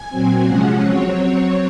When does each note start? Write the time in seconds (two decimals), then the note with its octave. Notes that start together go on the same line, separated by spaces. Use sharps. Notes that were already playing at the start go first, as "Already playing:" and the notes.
Already playing: G#5
0.09 A#2 F#3 C4
0.46 C3 F3 G#3 C#4 F#5
0.81 F#3 C4 C#5